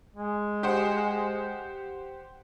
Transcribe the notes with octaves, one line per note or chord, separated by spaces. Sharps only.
G#3
G4 C5 F#5